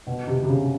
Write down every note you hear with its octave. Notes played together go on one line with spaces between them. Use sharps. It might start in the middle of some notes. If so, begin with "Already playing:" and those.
B2
C3
C3
C#3